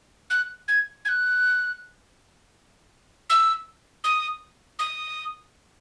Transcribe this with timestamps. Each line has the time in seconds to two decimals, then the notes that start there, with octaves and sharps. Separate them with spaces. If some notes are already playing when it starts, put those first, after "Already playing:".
0.30 F#6
0.68 G#6
1.05 G#6
1.09 F#6
3.30 E6
4.04 D#6
4.79 D#6